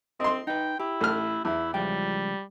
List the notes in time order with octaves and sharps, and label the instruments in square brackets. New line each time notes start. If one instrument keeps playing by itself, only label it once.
[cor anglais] C4 [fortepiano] D#5 C6
[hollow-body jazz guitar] D#4 B4 [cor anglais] G5
[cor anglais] E4 [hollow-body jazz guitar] G4
[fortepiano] A1 F6
[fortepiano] E2 [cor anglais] E4
[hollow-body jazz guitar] C#2 F3 G5 [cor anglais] G3